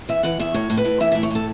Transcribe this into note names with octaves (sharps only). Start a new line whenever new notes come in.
E3 E5
E3 F#5
E2 E5
A2 C#5
A2
B4
A2
E3 E5
A2 E5
C#5
A2 A4